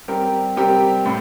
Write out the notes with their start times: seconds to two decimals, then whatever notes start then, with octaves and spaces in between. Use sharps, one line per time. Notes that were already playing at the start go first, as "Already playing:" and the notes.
0.08 G3 C4 G4 A#4
0.57 G3 C4 G4 A#4
1.06 A2